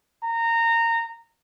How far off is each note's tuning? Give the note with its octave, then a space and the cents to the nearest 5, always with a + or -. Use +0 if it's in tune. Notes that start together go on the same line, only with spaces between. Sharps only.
A#5 -20